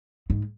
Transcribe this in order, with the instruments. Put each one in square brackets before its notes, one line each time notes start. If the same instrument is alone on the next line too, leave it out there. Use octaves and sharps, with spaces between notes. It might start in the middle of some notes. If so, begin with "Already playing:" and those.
[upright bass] G#2